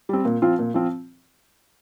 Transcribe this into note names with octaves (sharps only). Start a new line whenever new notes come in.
G3 C4
A#2
F3 C4 F4
A#2
F3 C4 F4